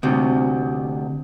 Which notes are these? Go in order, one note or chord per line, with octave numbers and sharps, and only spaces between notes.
D2 C3